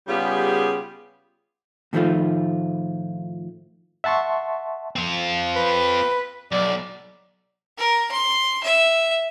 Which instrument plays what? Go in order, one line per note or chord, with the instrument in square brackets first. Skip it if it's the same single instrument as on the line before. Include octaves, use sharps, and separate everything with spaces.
[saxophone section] C#3 G3 B3 F4 G4 G#4
[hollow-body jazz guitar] A2 D#3 F3 G3 A3 F4
[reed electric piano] E5 F#5 A5 C6 C#6
[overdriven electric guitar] C4 F4
[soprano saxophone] B4
[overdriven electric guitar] B1 [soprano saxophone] D5
[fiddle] A#4
C6
E5